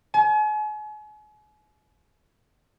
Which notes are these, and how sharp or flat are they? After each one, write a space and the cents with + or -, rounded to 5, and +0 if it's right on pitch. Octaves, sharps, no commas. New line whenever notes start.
G#5 +40